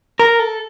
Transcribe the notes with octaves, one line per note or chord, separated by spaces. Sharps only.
A#4
A4